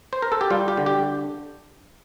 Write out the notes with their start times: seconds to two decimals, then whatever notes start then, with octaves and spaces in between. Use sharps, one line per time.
0.13 C5
0.22 A#4
0.32 A4
0.41 G4
0.50 G3 F4
0.68 G4
0.77 D3
0.86 G4